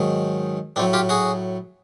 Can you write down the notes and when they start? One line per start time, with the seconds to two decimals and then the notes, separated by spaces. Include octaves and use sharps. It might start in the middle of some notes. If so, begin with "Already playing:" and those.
Already playing: G#2 D#3 F#3
0.76 A2 F#3 C4 D4
0.93 F4 G4
1.09 F#4 G#4